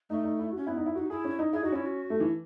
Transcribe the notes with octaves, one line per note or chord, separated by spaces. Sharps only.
A3 D#4
D#4
E4
C#4 F#4
B3 E4
D#4
E4
D#4 F#4
E4 G#4
C#4
D#4
E4 G#4
D#4 F#4
C#4 E4
F#4
A3
E3